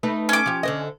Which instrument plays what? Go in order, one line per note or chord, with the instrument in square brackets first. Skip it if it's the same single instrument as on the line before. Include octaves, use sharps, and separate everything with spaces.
[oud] A3 D#4 B4
[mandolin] C#4 D6
[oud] F3 G4
D3 C5 D#5